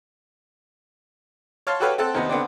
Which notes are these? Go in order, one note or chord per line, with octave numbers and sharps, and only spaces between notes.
C#5 F5 A5 C6
F#4 G4 A4 B4 C#5 F5
C4 A4 F#5 A5
D#2 C3 B3 D#4
D3 B3 C4 D4